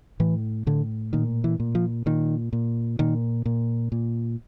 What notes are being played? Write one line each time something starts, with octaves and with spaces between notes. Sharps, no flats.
A2 E3
A2 D3
A#2 D#3
E3
A#2
F3
A#2 D#3
A#2
A#2 D#3
A#2
A#2